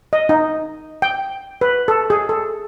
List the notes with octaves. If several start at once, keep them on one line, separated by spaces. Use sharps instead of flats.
D#5
D#4
G5
B4
A4
G#4
A4